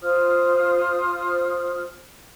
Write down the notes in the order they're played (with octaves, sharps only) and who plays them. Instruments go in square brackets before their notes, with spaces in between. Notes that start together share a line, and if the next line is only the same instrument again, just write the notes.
[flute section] F4 C5 D#6 F6